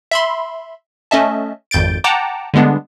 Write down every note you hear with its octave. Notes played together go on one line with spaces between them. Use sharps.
E5 B5 C6
A3 C#4 D#5 E5 A5
G#1 F2 G6 A6 D7
F#5 G5 A5 A#5 D6
D3 G3 G#3 B3 D4